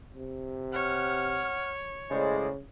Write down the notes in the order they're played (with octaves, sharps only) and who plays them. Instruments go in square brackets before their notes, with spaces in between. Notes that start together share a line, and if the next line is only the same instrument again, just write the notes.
[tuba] C3
[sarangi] C#5 [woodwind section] F#5 F6
[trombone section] A2 G#3 [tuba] C#3 [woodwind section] C5 D5